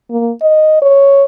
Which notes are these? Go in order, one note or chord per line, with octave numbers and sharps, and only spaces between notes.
A#3
D#5
C#5